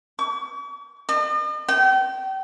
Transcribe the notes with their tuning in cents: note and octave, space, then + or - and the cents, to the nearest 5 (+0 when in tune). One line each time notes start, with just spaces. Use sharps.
C#6 +45
D#5 -45
G5 -35